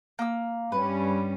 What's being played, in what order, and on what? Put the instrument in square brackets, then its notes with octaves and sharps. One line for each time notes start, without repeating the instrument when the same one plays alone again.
[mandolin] A#3 E6
[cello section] G2 G3 C#4 [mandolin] B4